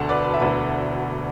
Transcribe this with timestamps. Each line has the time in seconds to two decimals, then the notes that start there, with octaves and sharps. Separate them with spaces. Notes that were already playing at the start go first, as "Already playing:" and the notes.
Already playing: E1 D2 D3 A5 C6
0.09 B4 D5
0.24 B4
0.34 E5
0.40 E1 D2 D3 B4 D5